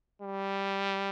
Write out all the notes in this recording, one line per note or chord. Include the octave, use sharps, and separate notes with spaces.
G3